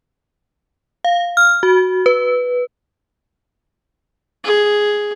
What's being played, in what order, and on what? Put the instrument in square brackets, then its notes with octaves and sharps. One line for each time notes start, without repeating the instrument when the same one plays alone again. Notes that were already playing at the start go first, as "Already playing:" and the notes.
[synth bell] F5
F6
F#4
B4
[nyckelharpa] G#4